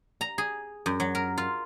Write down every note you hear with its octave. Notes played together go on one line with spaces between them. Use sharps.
A#5
G#4
F#2
F#3
A#4
F4